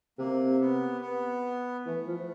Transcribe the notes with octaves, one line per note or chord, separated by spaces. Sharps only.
C3 A#3
B3
B3
E3 A3
F3